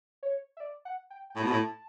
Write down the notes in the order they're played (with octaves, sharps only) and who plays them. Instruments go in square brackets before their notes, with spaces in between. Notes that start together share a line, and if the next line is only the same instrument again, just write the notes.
[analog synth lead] C#5
E5
D5
F#5
G5
G5
[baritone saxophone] A2 [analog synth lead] A5
[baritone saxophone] B2
A2